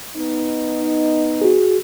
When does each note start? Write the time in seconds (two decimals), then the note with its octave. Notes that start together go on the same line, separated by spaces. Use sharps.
0.16 B3 D#4
1.41 F#4 G#4